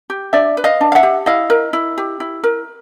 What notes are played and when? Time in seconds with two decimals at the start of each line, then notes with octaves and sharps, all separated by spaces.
0.10 G4
0.33 D4 D5 E5
0.57 B4
0.64 D#5 F5
0.81 D4
0.92 F5
0.95 E5 F#5
1.03 G4
1.26 E4 D#5 F5
1.50 A#4
1.73 E4
1.98 G4
2.20 E4
2.44 A#4